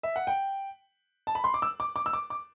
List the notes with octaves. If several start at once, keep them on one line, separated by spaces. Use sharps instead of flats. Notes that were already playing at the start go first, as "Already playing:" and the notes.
E5
F#5
G5
A5
B5
C6
D6
E6
D6
D6
E6
D6
D6